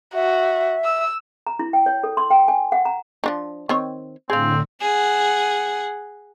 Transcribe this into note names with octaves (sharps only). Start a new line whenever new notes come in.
F#4 E5
E6
A#5
E4
G5
C#5
A4
C6
G5
G#5
F#5
A#5
F3 D4 D#4
D#3 C4 C#5
A2 D3 C4 G#4 F5
G#4 F#5